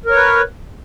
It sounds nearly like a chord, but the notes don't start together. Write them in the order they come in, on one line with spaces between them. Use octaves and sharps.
A#4 C#5 B4